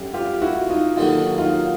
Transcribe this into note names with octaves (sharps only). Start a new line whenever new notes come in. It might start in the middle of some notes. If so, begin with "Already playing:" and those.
Already playing: F#2 D3 G3
F4 G4
E4 F#4
D#4 F4
D#2 D3 F#3 D#4 F4
D#4 F4